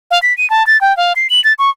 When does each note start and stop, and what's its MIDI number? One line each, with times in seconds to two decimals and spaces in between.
0.11 0.21 77
0.22 0.36 95
0.38 0.49 99
0.50 0.66 81
0.67 0.80 93
0.81 0.95 79
0.97 1.13 77
1.16 1.28 96
1.30 1.43 102
1.44 1.53 93
1.59 1.70 85